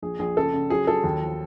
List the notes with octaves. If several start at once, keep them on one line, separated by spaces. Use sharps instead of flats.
A#1 G#4
A#1 G#4
C#3 A4
C#3
F#3 G#4
F#3 A4
D#2
F3